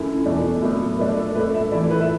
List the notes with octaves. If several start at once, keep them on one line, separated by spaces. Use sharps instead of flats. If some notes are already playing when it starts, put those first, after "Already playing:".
Already playing: F#2 D3 A3 E4
E2 B2 A3 D4
A2 F#3 B3 D4
A2 A3 D4 B4
A4
A2 A3 D4 B4
E5
A2 E3 A3 E4 D5
B4
E5